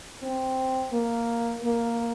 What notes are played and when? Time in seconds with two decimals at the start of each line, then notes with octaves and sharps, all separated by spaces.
0.23 C4
0.92 A#3
1.63 A#3